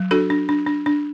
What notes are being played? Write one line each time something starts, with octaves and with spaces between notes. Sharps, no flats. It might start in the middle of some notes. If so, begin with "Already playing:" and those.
Already playing: F#3
D4 F#4 A4
D4
D4
D4
D4